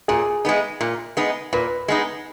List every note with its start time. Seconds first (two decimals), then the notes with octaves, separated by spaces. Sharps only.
0.08 A#2 G#4
0.45 G#3 B3 D#4
0.81 A#2
1.17 G#3 B3 D#4
1.53 A#2 B4
1.88 G#3 B3 D#4